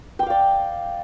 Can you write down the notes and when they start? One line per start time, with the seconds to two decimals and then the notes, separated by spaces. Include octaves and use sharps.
0.19 G5
0.23 D6
0.26 F5
0.30 D5